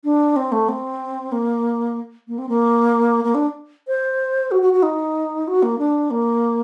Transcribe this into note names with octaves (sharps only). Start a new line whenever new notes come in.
D4
C4
A3
C4
A#3
A#3
C4
A#3
A#3
D4
C5
F#4
F#4
F#4
D#4
F#4
A#3
D4
A#3